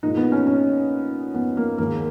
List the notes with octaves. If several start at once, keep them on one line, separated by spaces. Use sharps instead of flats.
A#2 G#3 D#4
B3
C#4
C#4
B3
A#3
D#2 D#3 G#3 A#3